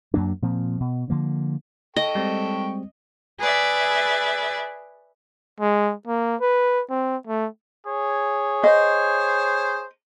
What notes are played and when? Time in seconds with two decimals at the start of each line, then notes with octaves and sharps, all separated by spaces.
0.14 F#2 F#3 A#3 D4
0.42 A#2 F3 C4
0.80 B2
1.10 D3 F3 A#3
1.96 A4 D#5 G5 C#6
2.15 G3 G#3 C4
3.39 G#4 B4 D5 E5
5.60 G#3
6.07 A#3
6.41 B4
6.90 C4
7.27 A3
7.86 G#4 C#5
8.64 C5 D#5